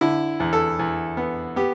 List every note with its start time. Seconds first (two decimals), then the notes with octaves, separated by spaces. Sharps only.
0.01 D3 E4
0.40 E2
0.53 A4
0.79 E2
1.17 B3
1.56 B3 G4